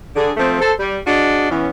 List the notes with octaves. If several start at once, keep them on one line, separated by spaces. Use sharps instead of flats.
D3 G#4
F3 A3 C4
A4 C5
G3
D4 F#4 G#4 D#5
E3 B3 C#4